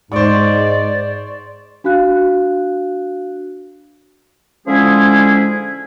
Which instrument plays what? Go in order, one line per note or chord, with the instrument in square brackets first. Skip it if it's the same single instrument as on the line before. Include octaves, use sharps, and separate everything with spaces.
[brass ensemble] G#2 [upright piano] C5 C#6 [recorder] D5
[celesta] D4 F#4 F5 F#6
[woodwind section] D3 F3 G#3 C#4 E4 G#4